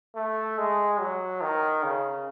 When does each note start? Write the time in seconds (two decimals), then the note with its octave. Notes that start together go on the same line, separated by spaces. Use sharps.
0.16 A3
0.58 G#3
1.00 F#3
1.41 D#3
1.83 C#3